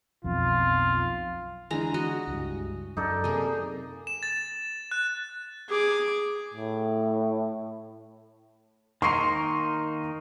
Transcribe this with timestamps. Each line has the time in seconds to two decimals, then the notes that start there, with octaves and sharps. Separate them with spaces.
0.24 B1 F2 F4
1.70 D3 E3 G#3 D4 A#5
1.94 F#4 D#5
2.28 C#2 G2
2.97 F#2 D#4 A4 D5
3.24 C3 A#3 G#4
4.07 E7
4.23 A6
4.91 F#6
5.69 G#4 D6
6.54 A2
9.02 D#3 A#3 D#4 C6 C#6 C7